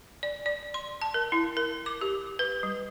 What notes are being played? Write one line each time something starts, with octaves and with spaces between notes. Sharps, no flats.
D5
D5
C6
A5
A#4
E4
A#4
D6
G4
B4
G3